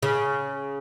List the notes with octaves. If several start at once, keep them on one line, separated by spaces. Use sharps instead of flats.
C#3